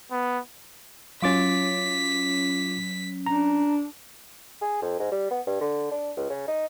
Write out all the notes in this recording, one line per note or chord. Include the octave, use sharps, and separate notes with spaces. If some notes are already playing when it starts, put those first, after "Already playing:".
B3
F#3 C#4 F4 D6 A6 B6
D4 A#5
G#4
F2
G#2
G3
B3
G2
D3
D4
C#2
C#3
D#4